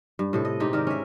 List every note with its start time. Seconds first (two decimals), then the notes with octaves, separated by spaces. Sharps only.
0.19 G2
0.33 A2 C3 A4
0.45 D#5
0.60 G#2 D#4 G4
0.73 D#3 A#4 D5
0.87 C#4 E5